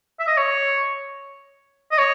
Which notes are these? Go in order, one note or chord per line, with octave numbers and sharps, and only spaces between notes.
E5
D#5
C#5
D#5
C#5